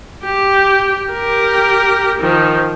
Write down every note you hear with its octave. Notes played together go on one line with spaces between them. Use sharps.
G4
G4 A#4
D#3 F3